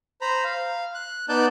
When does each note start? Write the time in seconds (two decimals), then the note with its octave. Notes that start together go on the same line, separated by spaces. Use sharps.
0.21 C5 A#5 B5
0.44 F5
0.95 F#6
1.29 B3 D#4 D5 A5 F#6 G6